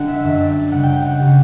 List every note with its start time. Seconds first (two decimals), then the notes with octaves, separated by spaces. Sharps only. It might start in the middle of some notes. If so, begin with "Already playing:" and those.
Already playing: D3 G3 F#5
0.08 E5
0.24 F#2 D3 G3 E5
0.40 D5
0.71 F#2 C#3 G3 F#5
0.83 G5
0.96 G5
1.08 F#5
1.20 C#3 G3 G4